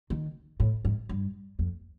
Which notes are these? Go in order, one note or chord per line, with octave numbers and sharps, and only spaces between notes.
D#3
A2
G#2
G2
F2